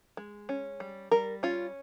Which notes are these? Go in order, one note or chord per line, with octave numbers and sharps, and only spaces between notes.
G#3
C#4
G3
G3 A#4
C#4 F4